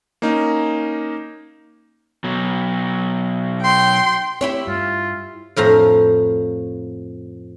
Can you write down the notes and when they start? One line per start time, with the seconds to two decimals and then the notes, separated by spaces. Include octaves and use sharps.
0.22 A#3 C#4 D#4
2.24 B2 F#3
3.61 G5 C6
4.41 C4 E4 G4 C#5
4.67 G2 F4
5.56 F2 A2 F3 A#5